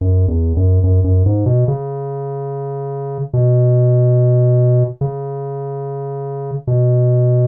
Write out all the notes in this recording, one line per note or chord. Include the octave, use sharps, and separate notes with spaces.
F#2
E2
F#2
F#2
F#2
G#2
B2
C#3
B2
C#3
B2